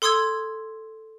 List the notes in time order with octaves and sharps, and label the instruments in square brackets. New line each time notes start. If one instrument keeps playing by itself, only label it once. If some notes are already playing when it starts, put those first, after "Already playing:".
[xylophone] A4 C6 D#6 E6 G#6